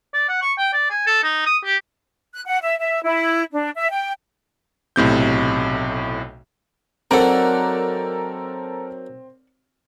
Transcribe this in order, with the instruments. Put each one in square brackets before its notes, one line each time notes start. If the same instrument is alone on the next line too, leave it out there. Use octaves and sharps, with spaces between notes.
[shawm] D5
F#5
C#6
G5
D5
G#5
A4
D#4
D#6
G4
[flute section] F#6
F#5
E5
E5
E4
D4
E5
G5
[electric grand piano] B1 A2 C3 G6
[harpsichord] F#3 A#3 D#4 [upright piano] C4 [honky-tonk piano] A4 A#4 [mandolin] D5 F#5